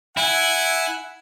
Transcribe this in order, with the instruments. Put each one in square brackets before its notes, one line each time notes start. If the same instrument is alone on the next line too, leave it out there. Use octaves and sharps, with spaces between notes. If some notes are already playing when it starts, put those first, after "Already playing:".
[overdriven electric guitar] E4 [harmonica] F#5 G#5